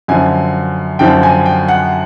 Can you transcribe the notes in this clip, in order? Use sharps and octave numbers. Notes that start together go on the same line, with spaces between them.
F#2 D3 F3 G#5
F#2 D3 F3 G5
G#5
G5
F#5